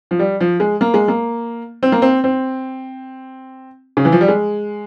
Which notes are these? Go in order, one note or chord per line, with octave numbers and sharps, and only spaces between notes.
F3
G3
F3
G#3
A#3
G#3
A#3
C4
A#3
C4
C4
C#3
E3
F3
G3
G#3